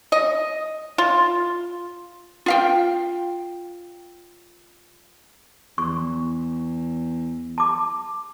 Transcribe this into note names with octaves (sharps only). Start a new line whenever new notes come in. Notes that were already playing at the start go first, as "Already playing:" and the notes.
D#5
F4
F4 F5 G5
E2 C#6
A5 D6